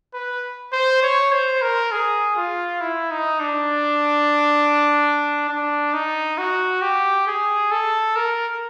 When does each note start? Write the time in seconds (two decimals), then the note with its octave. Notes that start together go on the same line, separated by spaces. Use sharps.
0.14 B4
0.73 C5
1.03 C#5
1.32 C5
1.62 A#4
1.92 G#4
2.37 F4
2.81 E4
3.11 D#4
3.40 D4
5.49 D4
5.93 D#4
6.38 F#4
6.82 G4
7.27 G#4
7.72 A4
8.16 A#4